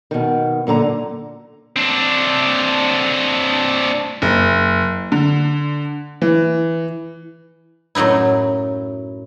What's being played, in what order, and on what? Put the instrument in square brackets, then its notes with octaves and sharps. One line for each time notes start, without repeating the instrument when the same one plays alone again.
[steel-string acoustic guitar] B2 D#3
F#2 A#2 D3 A#5
[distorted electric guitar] C4 D4
[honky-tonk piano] F#1
D3
E3
[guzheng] F#2 A2 F#3 D#4 E4